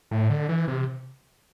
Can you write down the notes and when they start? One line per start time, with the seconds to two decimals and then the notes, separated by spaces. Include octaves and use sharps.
0.11 A2
0.30 D3
0.49 E3
0.68 C3